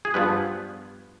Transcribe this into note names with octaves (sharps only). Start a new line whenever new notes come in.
G#4
G2 F3 B3 B4